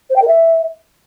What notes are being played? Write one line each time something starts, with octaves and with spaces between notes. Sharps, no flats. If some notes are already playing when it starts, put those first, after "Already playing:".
C5
G5
A#4
E5